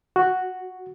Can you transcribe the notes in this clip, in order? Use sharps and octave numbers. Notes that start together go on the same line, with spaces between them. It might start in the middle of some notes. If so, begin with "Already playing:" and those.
F#4